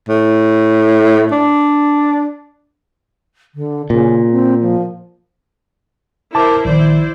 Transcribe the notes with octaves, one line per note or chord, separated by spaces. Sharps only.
A2
D4
D3
A#2 C#3
C4
F3
E4 A#4 C5 A5 D6
A#1 D#3 E4 C5 D5